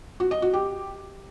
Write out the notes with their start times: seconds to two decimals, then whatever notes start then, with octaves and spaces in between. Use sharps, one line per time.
0.20 F#4
0.31 D#5
0.42 F#4
0.53 G4